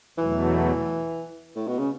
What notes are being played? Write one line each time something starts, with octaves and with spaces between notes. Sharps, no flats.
E2 B2 E3 F#3 A3
A2
B2
C#3